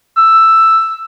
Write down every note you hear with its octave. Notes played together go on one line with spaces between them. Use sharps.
E6